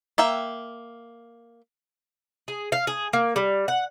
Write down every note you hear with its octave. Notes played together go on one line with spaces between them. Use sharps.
A#3 E5 G5
G#4
F5
G#4
A#3
G3
F#5